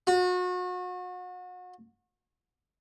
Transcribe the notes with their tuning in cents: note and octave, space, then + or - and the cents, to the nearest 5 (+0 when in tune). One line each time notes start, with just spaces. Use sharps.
F#4 -35